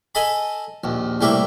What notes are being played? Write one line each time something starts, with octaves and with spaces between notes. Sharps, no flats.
A4 D#5 G#5 A5 B5
A#1 D#2
C2 A2 G3 A#3 G4 E5